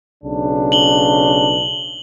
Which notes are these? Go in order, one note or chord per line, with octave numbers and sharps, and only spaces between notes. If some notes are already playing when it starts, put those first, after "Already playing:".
B1 C#3 D4
F#7 G7